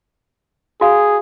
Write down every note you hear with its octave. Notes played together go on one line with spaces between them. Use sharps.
F#4 G#4 F5